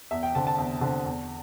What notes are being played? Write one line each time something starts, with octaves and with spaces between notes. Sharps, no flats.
E2 E5
G5
D3 C4 A5
A5
E2
D3 C4
E2